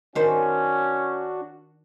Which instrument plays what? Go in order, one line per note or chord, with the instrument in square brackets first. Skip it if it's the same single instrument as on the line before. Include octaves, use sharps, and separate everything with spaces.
[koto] D#3 C5 [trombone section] C#4 [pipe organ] D4 F#4